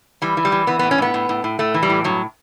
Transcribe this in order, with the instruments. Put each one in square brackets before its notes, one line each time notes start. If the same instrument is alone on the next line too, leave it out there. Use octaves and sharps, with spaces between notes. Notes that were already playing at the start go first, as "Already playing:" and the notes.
[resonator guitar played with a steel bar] E3 G3
E3
G3
E3
E3 B3
B3
A2
C#4
A2 B3
A2
A2
A2
A2 A3
E3
G3
A2
G2 F#3